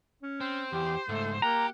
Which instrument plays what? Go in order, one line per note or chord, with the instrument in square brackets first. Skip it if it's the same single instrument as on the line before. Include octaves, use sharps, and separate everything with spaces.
[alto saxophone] C#4
[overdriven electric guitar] C4 [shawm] C5
[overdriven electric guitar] E2 [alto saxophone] G4
[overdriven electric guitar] C#2 G#2 [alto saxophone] A3
[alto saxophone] A#3 [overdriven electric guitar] G4 [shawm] F#5 [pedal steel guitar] A#5